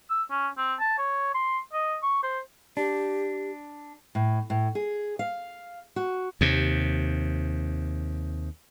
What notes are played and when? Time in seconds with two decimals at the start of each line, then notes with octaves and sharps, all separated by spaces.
0.10 E6
0.31 C#4
0.57 C4
0.80 A5
0.98 C#5
1.34 C6
1.73 D#5
2.03 C#6
2.23 C5
2.77 D4 G4
4.15 A2
4.50 A2
4.75 G#4
5.19 F5
5.96 F#4
6.41 D#2 C3